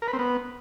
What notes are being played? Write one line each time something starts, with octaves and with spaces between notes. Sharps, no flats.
A#4
B4
C4
B3